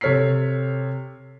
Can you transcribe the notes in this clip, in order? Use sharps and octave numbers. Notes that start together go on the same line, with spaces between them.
C3 A4 C#5 F6 B6 C7